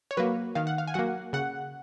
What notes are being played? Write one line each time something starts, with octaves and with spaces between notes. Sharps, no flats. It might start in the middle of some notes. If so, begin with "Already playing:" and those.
C#5
F#3 A#3 B4
D#3 F5
F#5
F5
G#5
F#3 A#3 F#5
C#3 F#5